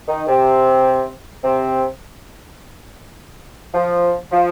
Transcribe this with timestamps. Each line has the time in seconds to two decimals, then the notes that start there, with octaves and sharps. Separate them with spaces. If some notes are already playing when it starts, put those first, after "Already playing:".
0.08 D#3 D#4
0.27 C3 C4
1.44 C3 C4
3.74 F3
4.32 F3